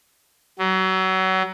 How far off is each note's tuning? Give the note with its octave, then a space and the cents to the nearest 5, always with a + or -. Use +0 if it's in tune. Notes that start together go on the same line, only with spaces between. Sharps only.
F#3 +30